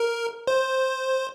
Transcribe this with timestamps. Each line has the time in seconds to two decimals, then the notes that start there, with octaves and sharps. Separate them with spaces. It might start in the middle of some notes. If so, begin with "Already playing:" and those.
Already playing: A#4
0.47 C5